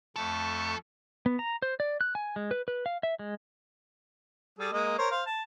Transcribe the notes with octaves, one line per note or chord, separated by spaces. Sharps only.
F2 A3 A4 C#6
B3
A#5
C5
D5
F#6
G#5
G#3
B4
B4
F5
E5
G#3
G3 G#4 A4
G#3 A#3 D#5
A#4 C5 C#5
C5 F5
A5